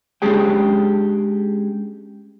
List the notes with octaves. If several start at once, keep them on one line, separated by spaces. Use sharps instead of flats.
G#3 C#4 D4 G4 G#4 G5